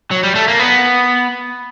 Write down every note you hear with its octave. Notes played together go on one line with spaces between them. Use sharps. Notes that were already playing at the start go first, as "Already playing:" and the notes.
F#3
G3
A3
A#3
B3